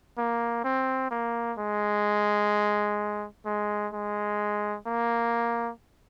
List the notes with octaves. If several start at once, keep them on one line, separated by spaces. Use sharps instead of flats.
A#3
C4
A#3
G#3
G#3
G#3
A#3